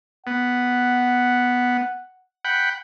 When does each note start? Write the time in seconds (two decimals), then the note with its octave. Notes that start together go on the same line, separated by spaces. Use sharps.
0.27 B3 F#5
2.45 F#5 G5 B5